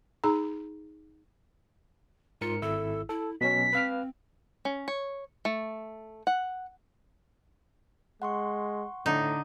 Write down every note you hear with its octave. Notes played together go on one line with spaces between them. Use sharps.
D#4 G#4 A#5
G#2 F4 A#4 C#7
G#1 E4 A4 E6
E4 A4
B2 F#3 C#4 F#4 B6
C4 B4 F5 F6
C#4
C#5
A3
F#5
G#3 F#5 C6 C#6
A2 D3 D#4